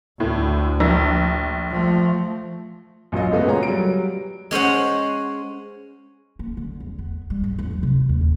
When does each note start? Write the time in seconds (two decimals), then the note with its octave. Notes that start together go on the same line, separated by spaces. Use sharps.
0.20 D2 A2
0.80 A#1
1.71 F3 A3
3.12 A#1 F#2 F4 D#5
3.32 C#2 A3 B3
3.46 A#2 F#4 G#4 C#5 A#5
3.63 F#3 G3 D7
4.51 G#3 C#4 C5 F#5
6.39 A#3
6.57 D3
6.80 E2
6.99 B3
7.30 G3
7.44 G#1
7.59 E2
7.71 F#3
7.83 C3
8.09 D#2
8.21 A#2